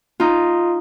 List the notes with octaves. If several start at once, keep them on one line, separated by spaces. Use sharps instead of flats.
D#4 F4